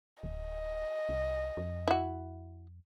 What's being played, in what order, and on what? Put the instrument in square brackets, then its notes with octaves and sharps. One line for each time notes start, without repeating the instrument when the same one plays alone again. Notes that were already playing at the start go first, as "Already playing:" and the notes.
[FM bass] D1 [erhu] D#5
[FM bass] C2
F2
[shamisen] E4 F#4